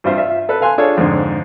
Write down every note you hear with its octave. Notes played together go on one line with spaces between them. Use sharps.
G2 C4 F4 C5 E5
F4 E5
A4 B4
A4 F5 G#5 C6 F#6
D4 F4 G#4 A4 C#5
F2 G#2 D3